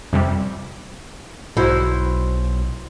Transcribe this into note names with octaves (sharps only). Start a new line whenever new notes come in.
F2 C3 G3
B1 G#2 E4 F#4 C5